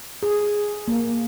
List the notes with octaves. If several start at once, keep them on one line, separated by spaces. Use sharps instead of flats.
G#4
A#3